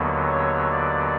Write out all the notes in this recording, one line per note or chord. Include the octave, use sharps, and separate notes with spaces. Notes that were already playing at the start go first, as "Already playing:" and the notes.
Already playing: D#2 D3 F#3 B3
C#5
D5